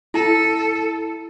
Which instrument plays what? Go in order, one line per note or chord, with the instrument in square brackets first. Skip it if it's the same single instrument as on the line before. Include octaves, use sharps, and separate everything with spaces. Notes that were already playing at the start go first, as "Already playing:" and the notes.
[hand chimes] E4 A5 [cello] A4